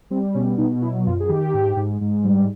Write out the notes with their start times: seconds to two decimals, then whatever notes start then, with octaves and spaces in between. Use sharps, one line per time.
0.11 G3 C4
0.34 B2 C#4
0.58 B2 D#4
0.82 F#3 E4
1.06 F#2 F4
1.20 G#4
1.29 D#3 G4
1.54 G#2
1.76 G#2
2.01 G#2
2.25 G3